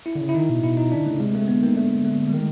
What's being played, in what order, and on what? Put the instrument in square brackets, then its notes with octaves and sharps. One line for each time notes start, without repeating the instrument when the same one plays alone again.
[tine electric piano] E4
[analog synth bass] D3
C#3
[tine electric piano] E4
[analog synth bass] D#3 [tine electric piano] D#4
[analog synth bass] B2
[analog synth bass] B2 [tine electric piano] E4
[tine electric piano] D#4
[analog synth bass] D3 [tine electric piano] D4
[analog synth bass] C#3 [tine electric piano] A3
[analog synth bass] C3 [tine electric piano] G#3
[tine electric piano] A3
[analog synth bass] D3 [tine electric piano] B3
[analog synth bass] D#3 [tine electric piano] A#3
[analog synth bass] D3 [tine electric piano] A3
[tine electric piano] A3
G3
[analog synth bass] D#3 [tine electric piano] G#3